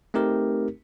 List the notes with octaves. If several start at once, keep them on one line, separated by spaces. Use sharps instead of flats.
A3 C4 D#4 G4 A#4